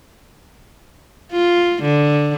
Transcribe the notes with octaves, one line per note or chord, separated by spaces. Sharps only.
F4
D3